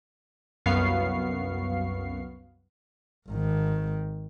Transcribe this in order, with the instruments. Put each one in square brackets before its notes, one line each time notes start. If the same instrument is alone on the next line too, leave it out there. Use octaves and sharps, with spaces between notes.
[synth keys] C2 F#2 B3 F5 C#6 C7
[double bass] G#1 D#3